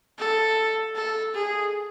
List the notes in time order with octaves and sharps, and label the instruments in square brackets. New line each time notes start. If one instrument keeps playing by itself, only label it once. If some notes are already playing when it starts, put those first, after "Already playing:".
[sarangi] A4
A4
G#4